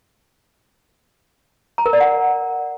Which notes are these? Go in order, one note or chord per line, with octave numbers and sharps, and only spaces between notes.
A#5
A#4
D5
F#5